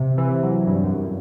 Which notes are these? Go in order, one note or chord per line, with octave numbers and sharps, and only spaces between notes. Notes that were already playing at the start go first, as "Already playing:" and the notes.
Already playing: C3
E3
F#3
G2
F#2